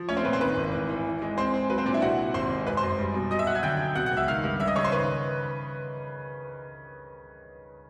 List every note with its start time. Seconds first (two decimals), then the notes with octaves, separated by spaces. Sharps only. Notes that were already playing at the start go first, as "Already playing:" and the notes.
Already playing: F3
0.09 A3 C#4 C#5
0.17 C4 C5
0.25 A#2 B4
0.33 C4 C5
0.41 D#3 B4
0.57 G#1
0.73 E3
0.89 E3
1.06 E3
1.22 G#3
1.37 G#3 C4 C5
1.54 C4
1.70 F#3 B4
1.78 C4 C5
1.86 A#2 D4 D5
1.94 E4 E5
2.02 C3 F#4 F#5
2.18 C3
2.34 G#1 C5 C6
2.50 G#3
2.67 F#2 B4 B5
2.77 C5 C6
2.83 F#2
2.99 G3
3.15 B2
3.31 F#3 D#5 D#6
3.39 E5 E6
3.47 F#3 F#5 F#6
3.55 G#5 G#6
3.63 D3 G5 G6
3.79 F#3
3.95 B2 F#5 F#6
4.06 F#5 F#6
4.11 C#2
4.17 E5 E6
4.28 D#3 F5 F6
4.44 G2
4.60 C#3 E5 E6
4.67 D#5 D#6
4.76 C#3 C#5 C#6
4.84 C5 C6
4.92 D#3 B4 B5